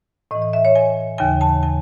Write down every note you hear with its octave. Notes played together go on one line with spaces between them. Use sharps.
A2 E3 D#5
D#5
E5
C#5
G#5
D#2 C#3 E3 G#5
A5
G#5